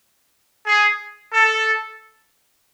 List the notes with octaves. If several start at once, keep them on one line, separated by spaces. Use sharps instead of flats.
G#4
A4